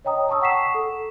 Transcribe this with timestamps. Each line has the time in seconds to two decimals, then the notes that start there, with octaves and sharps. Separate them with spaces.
0.05 C#5 D#5 G5 A#5 D#6
0.29 A5 A#5 C#6 D#6 E6
0.42 F#5 C#6 B6 C7 E7
0.74 A4